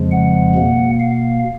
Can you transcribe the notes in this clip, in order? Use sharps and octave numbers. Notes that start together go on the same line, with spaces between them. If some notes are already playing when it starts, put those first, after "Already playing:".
Already playing: F2 C#3 F3 G#3
F#5
B2 A#3
F5